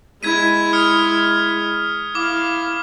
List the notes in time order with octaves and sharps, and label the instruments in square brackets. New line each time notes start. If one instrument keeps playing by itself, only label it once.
[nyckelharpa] G#3 E4 [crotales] G#6 B6 D#7
[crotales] D#6 F6 C#7
[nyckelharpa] E4 F5 [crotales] D6